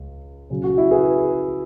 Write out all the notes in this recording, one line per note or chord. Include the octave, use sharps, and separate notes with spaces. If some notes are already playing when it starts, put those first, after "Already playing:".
Already playing: C#2
C#3 F#3 C#4
F#4
E4
G#4 B4